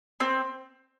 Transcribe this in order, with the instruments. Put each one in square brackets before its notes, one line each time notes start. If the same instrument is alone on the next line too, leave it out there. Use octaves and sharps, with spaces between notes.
[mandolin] C4